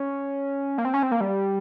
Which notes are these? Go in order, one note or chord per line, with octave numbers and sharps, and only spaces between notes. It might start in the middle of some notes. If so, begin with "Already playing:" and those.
Already playing: C#4
A#3
C4
C#4
C4
A#3
G3